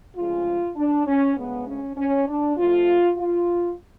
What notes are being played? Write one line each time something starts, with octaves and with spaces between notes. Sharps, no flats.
D2 C#3 F3 G#3 F4
D4
C#4
D2 C#3 G#3 B3
C#4
C#4
D4
F2 F3 A3 F4
F4